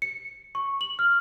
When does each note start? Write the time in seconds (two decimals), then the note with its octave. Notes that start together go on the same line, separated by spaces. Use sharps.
0.02 C#7
0.55 C#6
0.81 F#7
0.99 F6